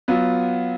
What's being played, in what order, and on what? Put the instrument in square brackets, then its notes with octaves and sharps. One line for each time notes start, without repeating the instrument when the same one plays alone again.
[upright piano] F#3 B3 F4